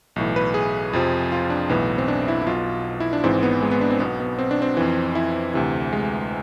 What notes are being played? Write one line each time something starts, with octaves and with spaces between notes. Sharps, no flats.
B1 A2 E3
B4
G#4
F2 C3 F3
F4
D4
B1 A2 E3 B3
C4
D4
E4
E4
B1 B2 F4
E4
D4
G#1 G#2 E3 C4
B3
G#3
B3
D4
C4
B1 B2 B3
B3
C4
D4
C4
F2 E3
E4
D2 C3 E3
G#3